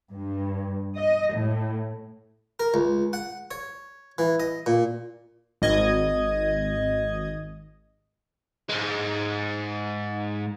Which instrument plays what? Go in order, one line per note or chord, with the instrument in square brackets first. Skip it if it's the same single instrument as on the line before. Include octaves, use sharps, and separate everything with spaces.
[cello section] G2
D#5
A2
[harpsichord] A#4
C#2
F#5
C#5
E3
D#5
A#2
[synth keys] G#1 D#5 G#6
[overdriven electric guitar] G#2 G#3